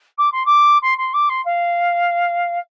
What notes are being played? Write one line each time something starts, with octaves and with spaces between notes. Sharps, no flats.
D6
C6
D6
C6
C6
D6
C6
F5